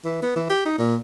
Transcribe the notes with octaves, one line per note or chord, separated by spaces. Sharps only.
E3
B3
E3
G4
D#4
A#2